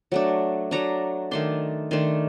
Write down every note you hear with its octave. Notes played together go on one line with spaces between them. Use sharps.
F#3 A3 D4
F#3 A3 D4 A#5
D#3 A3 D4 C6
D#3 A3 D4 C6